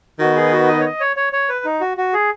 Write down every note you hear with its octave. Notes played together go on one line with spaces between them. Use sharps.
D#3 B3 D#4 F#4 B4
G#4
F#4
D#5
C#5
D#5
C#5
C#5
C#5
B4
D#4
F#4
F#4
G#4